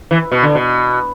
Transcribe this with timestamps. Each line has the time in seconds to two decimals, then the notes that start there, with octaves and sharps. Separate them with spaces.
0.11 E3
0.32 B2
0.43 D3
0.55 B2